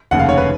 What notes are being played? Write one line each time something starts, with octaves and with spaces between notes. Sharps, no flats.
F1 D#2 C#3 F#5
F5
C#5
B4